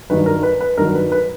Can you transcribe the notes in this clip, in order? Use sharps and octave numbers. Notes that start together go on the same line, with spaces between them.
G2 D#3 F#3 B4
A#4
B4
B4
G2 D#3 F#3 A#4
B4
B4